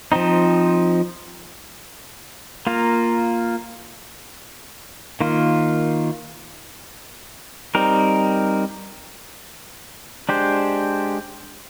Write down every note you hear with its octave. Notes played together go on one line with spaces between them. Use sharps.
F3 C4 D#4
A#3 F4 A#4
D#3 A#3 F4
G3 C4 D#4 A#4
G#3 D4 G4 C5